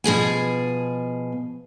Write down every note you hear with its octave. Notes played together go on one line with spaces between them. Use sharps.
B2 F3 G#4 G#5